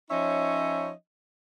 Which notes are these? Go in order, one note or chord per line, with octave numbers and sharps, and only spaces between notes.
F3 C#4 D#4 C#5 D#5 E5